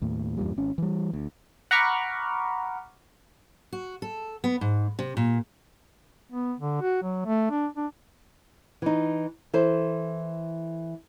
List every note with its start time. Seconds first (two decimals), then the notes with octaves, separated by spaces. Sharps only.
0.02 D#2 A2
0.37 E2 G2 A#2 G3
0.57 G#1 C#4
0.78 E3 G3
1.13 D2
1.71 F#5 A#5 B5 C#6 D6 F6
3.73 F#4
4.02 A4
4.44 B3
4.61 G#2
4.99 C3
5.17 A#2
6.32 B3
6.60 D3
6.81 F#4
7.02 F#3
7.26 A3
7.50 D4
7.77 D4
8.82 E3 D#4
9.53 E3 A4 C5